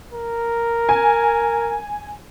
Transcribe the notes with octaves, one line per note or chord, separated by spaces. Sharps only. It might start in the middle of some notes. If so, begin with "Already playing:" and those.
A#4
G#5